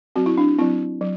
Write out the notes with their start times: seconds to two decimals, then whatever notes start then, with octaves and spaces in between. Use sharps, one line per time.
0.16 F#3 C4 F#4
0.26 E4
0.38 D4
0.58 F#3 C4 E4
1.01 F#3